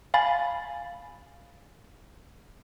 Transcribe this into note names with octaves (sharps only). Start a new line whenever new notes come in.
F5 G#5 B5 A6